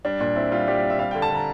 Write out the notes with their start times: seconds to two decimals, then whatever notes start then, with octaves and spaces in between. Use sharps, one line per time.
0.05 G3 D4
0.21 A#2 D4
0.36 C4 E4
0.51 G3 F4
0.68 G3 G4
0.83 C4
0.90 E5
0.99 G3 F5
1.11 G5
1.15 D3
1.22 A5
1.30 D3 A#5